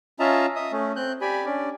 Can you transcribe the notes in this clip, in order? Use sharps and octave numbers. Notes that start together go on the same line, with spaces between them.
C#4 F4 D#5 E5 A5 A#5
D#5 E5 D#6
A3 C#4
C4 F#6 G6
G4 D5 G#5 B5
C#4 D4 D5